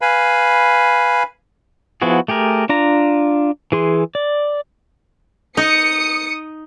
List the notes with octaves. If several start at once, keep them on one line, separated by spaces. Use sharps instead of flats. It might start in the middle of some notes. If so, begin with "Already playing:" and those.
B4 F5 G#5 B5
F3 B3 E4 F#4 G#4
A3 G4 G#4 A#4
D4 F4 A#5
E3 G#4 C6
D5
D#4 D#6 C#7